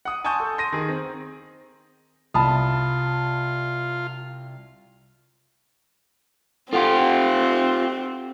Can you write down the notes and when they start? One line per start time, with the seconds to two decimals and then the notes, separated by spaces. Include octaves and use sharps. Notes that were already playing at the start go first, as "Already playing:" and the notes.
0.05 F#5 D#6
0.24 G#5 A5 C6 C#6 D#6 G6
0.40 A4
0.58 C6 A#6 D#7
0.72 D#3 G#4
0.89 C4
2.34 C2 F4 A5 B5 D#6
6.73 C4 F4 G4 A4 F#5 C6